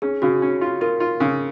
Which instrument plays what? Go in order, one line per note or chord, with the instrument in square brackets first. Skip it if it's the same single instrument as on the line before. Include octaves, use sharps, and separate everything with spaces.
[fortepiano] C#4 [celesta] G#4
[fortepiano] C#3 [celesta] F#4
[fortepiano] C#4
F4
[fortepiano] F4 [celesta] A#4
[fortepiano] F4
C#3